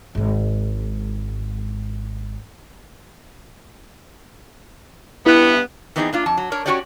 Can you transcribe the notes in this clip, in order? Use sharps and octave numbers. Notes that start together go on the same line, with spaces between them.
G#1 G#2
G2 B3 E4
E3 B3 C4 D#4 E4 G#4
A#3 D4 F4
F2 A5
F#3
D4 A#4 C#5
C#4 E4 F#4 G4 C#5 D5